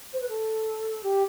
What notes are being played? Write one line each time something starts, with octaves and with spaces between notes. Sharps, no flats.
C5
B4
A4
G4